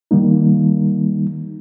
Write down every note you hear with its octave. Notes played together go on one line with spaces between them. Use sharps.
D#3 G3 A#3 D#4